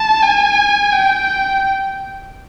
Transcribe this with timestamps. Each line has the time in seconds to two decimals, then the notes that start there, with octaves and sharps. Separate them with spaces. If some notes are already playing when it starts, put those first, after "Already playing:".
Already playing: A5
0.23 G#5
0.93 G5